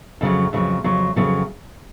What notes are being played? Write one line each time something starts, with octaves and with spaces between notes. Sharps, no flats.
F2 C#3 F#3
F2 C#3 F#3
F2 C#3 F#3
F2 C#3 F#3